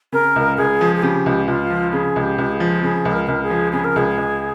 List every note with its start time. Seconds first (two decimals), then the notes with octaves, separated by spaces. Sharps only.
0.12 C#3 A#4
0.36 C#2
0.58 C#2 G#4
0.81 F3
0.95 G#4
1.02 C#3 G4
1.26 C#2
1.48 C#2 F4
1.70 F3
1.92 C#3 G#4
2.16 C#2
2.22 G4
2.38 C#2
2.52 G#4
2.60 F3
2.83 C#3 G#4
3.05 C#2
3.13 A#4
3.27 C#2 A#4
3.43 G#4
3.50 F3
3.73 C#3 G#4
3.84 A#4
3.96 C#2 G#4
4.17 C#2